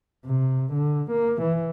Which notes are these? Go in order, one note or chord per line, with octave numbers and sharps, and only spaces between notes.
C3
D3
A#3
E3